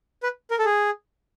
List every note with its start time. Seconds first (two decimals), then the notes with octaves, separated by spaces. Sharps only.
0.23 B4
0.51 A#4
0.59 A4
0.65 G#4